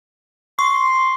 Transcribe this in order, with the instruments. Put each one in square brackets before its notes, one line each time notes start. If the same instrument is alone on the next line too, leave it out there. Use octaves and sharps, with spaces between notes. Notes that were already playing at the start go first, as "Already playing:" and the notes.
[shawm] C6 [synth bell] C#6